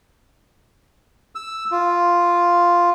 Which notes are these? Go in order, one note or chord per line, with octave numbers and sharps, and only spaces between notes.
E6
F4